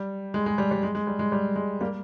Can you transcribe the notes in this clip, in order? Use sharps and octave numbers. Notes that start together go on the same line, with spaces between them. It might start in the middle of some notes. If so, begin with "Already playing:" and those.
Already playing: G3
G#3
G#3
G3
G3
G#3
G#3
G3
G#3
G3
G#3
G3 A#3